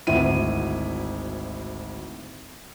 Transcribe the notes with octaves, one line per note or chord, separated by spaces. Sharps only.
G#1 D2 E4 D#7